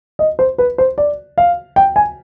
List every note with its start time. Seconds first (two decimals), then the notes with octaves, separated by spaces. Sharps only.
0.19 D#5
0.39 C5
0.58 B4
0.78 C5
0.98 D5
1.38 F5
1.76 G5
1.96 G#5